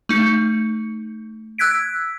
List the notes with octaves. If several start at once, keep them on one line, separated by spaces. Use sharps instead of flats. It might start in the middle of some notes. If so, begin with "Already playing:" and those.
A3 D#4 C#7
E6 F#6 G#6 B6 D7